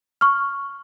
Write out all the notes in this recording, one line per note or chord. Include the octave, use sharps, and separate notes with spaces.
C#6 F6